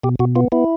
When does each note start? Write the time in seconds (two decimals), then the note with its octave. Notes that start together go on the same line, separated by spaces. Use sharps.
0.04 B2 G4
0.19 B2 F#4
0.35 B3 F4
0.52 B3 E4